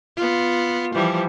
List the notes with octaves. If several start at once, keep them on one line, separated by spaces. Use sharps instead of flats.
B3 F4
E3 F3 G3